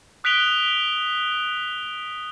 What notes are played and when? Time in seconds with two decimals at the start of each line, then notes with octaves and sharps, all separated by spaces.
0.24 D#6 F#6 B6 D7 F7 G7